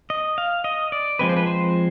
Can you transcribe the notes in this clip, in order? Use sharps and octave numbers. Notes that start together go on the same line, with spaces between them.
D#5
F5
D#5
D5
F3 G#3 C4 B4
C5
B4
C5